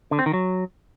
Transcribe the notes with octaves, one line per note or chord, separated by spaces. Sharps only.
D3
C4
D#3
F#3